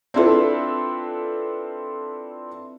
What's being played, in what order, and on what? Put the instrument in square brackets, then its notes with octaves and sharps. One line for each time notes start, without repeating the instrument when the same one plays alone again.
[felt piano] C4 D4 E4 F4 A4 B4